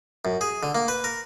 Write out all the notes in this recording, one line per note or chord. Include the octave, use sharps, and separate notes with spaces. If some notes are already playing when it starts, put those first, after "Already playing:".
F#2
G#4
D3
A#3
B4
A#4